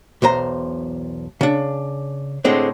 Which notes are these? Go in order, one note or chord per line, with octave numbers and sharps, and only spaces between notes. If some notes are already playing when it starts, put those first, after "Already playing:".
B1 E2 C5 A#5
C#3 D4
A2 D3 G#3 C4 D4